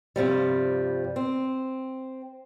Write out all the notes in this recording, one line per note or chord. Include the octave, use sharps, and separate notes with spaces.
G2 C3 F3 G3
C4